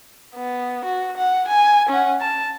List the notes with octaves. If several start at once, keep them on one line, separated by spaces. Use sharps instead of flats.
B3
F#4
F#5
G#5
C#4 F#5
A5